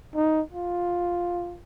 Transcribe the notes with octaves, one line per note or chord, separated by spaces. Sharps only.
D#4
F4